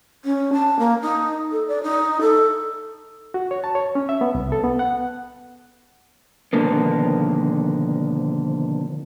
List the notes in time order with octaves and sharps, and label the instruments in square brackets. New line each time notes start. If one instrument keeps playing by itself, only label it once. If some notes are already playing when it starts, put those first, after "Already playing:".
[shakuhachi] C#4
A5
A#3
D#4
A4
D5
D#4
A4
[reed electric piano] F#4
C#5
A5
C#5
C#4
E5
B3
C2
A4
B3
F#5
[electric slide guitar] B2 D3 D#3 F3 A#3 B3